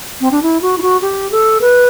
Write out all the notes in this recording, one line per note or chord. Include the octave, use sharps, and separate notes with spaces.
C4
D4
E4
F#4
E4
F#4
G4
A4
B4